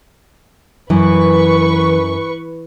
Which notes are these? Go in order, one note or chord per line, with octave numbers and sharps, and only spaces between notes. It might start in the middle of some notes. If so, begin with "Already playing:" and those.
F#2 E3 B4 C#6